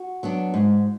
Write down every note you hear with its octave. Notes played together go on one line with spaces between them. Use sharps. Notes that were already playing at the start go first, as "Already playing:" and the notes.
Already playing: F#4
F#3 B3 D4
G#2